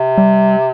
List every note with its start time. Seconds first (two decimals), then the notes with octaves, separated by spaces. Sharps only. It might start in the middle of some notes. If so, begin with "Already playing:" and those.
Already playing: C3
0.18 G3